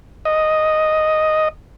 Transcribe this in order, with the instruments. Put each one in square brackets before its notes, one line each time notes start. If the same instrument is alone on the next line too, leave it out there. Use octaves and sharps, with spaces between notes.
[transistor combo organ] D#5